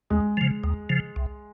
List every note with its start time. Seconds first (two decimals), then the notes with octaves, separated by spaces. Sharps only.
0.10 D#2 G#3
0.37 C#3 F3
0.64 D#2
0.90 C#3 F3
1.16 C2